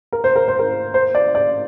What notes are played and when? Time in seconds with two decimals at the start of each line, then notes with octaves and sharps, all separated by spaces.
0.13 A#4
0.24 C5
0.36 A#4
0.48 C5
0.59 A#4
0.94 C5
1.15 D5
1.35 D5